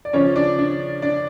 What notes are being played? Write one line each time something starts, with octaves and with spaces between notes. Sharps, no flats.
D5
C#3 F3 C#4 C#5
D4 D5
D4 D5
D4 D5